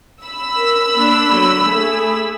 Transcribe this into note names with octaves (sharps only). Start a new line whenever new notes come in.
B5 E6
A#4
A#3 D4
D3 F#3
A3 G#4